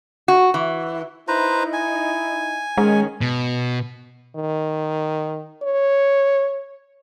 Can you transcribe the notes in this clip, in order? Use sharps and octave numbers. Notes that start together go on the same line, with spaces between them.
F#4
E3
D#4 E4 B4 C5 A#5
G#5
D#3 G#3 C#4
B2
D#3
C#5